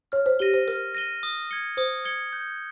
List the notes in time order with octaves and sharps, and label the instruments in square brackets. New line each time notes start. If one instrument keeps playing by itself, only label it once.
[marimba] C#5 [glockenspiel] F6
[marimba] C5
[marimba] G4 [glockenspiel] A#6 D#7 G7
[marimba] C5
[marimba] A#4 [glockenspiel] F6
[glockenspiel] A#6 D#7 G7
D#6
G#6 C#7 G7
[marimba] C5 [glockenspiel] D#6
[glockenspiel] G#6 C#7 G7
G6